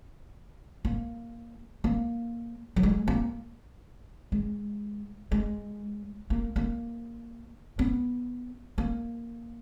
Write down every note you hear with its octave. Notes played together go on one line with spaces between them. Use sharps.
A#3
A#3
F#3
G#3
A#3
G#3
G#3
A#3
A#3
B3
A#3